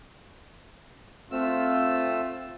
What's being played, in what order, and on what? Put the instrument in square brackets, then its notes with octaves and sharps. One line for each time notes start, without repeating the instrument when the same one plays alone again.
[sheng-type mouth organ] A3 E6 [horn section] C4 F4